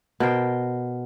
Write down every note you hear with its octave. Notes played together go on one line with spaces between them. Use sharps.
B2 A#4 C5 G5